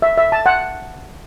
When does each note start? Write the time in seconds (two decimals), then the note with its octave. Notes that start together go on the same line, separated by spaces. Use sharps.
0.02 E5
0.18 E5
0.32 A5
0.46 F#5